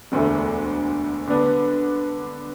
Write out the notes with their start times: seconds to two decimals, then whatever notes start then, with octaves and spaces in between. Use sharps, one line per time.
0.12 E1 D2 D3 A3
1.27 D3 B3 D4